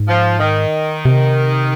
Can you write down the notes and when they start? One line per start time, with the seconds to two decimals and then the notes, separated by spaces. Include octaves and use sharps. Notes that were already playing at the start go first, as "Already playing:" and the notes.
Already playing: G#2
0.08 F3
0.40 D#3
1.05 C3